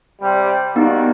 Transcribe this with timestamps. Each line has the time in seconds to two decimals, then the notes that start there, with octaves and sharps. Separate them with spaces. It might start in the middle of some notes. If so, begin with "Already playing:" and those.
0.22 C3 G3
0.76 G3 A#3 B3 D#4 F#4